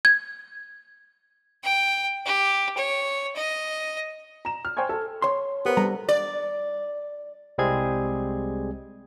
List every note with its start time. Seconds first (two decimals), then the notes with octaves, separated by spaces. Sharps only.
0.05 G#6
1.64 G5
2.26 G4
2.78 C#5
3.36 D#5
4.45 A#5 E7
4.65 F6
4.77 C5 G5 G#5 C#6 G#6
4.89 A4
5.22 C#5 C6
5.65 B3 G4 A#4 C5
5.77 G3 A4 A#5
6.09 D5
7.58 C2 G3 G#3 C4 G#4 G#6